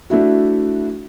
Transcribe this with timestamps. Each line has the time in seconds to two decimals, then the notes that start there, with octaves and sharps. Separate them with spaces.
0.10 A3 D4 E4 F#4